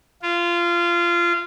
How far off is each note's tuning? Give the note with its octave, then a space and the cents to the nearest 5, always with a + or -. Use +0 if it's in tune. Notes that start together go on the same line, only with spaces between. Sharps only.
F4 -20